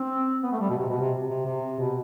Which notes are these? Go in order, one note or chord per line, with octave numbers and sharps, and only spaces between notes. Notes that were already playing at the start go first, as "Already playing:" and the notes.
Already playing: C4
B3
A3
G3
B2
C3
B2
C3
C3
C3
B2